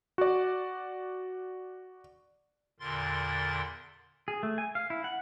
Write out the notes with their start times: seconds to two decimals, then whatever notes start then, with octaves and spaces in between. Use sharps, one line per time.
0.18 F#4 D5
2.80 E2 A#2 D3 A#4 C6 A6
4.28 G#4
4.43 A3
4.58 G#5
4.75 F5
4.90 E4
5.04 F#5